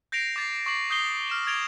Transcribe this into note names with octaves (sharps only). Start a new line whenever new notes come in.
G6 A#6 C7 D7 F7
D6 A6 C7
C#6 D6 C7 F#7
D#6 G6 C7 G7
F6 E7 G7
G#6 A6 D7 F7 G7